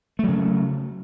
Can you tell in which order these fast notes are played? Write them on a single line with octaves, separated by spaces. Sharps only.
A3 F#3 C#3